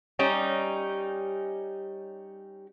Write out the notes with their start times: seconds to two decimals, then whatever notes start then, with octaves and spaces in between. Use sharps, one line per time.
0.19 G3 C#4 D#4